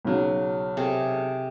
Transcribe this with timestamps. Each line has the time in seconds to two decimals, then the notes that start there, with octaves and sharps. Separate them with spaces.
0.05 B1 C#3 F#3
0.77 C3 G#4 A4